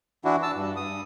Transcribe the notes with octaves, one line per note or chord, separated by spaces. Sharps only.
E3 D4 E4 F#4
A5 E6
G2
G2 D#6